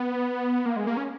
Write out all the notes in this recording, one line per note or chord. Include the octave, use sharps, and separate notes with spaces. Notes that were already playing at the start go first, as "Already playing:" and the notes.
Already playing: B3
A#3
G#3
A#3
C#4